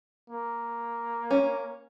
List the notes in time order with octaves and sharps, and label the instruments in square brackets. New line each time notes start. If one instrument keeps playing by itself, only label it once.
[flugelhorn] A#3
[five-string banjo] C#4